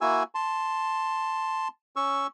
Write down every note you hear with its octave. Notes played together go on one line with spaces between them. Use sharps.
A#3 E4 F#4 G#5 E6
A5 C6
C#4 C#6 E6